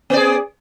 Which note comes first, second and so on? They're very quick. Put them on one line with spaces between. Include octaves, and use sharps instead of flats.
B3 D5 G#4